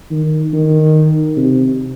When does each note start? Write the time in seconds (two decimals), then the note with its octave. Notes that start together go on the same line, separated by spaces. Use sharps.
0.11 D#3
0.53 D#3
1.37 C3